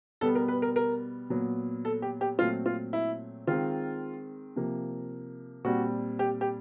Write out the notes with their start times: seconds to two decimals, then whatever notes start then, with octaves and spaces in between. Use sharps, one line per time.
0.21 B2 G3 B3 A4
0.35 A#4
0.48 B4
0.62 A#4
0.76 A#4
1.30 A#2 F#3 B3
1.85 A4
2.02 G4
2.21 G4
2.38 A#2 F#3 A3 C4 F4
2.66 F4
2.93 E4
3.47 D#3 G#3 C4 F4
4.56 C3 F3 A#3
5.64 A#2 G3 C4 F#4
6.19 G4
6.41 G4